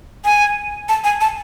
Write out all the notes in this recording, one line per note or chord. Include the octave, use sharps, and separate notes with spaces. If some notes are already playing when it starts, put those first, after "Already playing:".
G#5
A5
G#5
A5